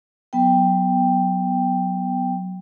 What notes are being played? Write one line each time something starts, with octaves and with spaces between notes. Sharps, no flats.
F#3 B3 G5